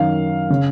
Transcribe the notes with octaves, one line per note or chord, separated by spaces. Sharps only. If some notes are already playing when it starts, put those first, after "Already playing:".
Already playing: F#2 D#3 F5
C#3